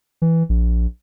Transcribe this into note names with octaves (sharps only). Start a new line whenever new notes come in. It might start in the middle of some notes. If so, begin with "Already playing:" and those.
E3
A#1